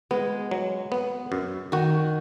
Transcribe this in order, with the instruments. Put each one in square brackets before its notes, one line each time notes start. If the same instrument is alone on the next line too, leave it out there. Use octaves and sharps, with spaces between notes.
[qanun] G#3 [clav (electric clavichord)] B3
[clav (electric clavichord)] F#3
B3
F#2
[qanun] D#3 [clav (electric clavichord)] F#4